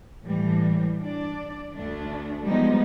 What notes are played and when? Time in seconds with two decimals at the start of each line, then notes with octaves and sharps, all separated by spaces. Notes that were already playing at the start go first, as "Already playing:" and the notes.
0.24 A2 E3 G3
1.02 D4 D5
1.74 D2 A3 D4
2.45 F3 G3 G#3 B3 D#4